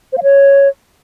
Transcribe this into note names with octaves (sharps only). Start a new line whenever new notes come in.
C5
F5
C#5